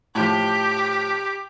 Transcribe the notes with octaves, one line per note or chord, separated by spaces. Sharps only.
A2 F3 G4